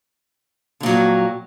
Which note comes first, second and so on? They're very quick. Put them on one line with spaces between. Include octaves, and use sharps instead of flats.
D3 A#2 F#3 F2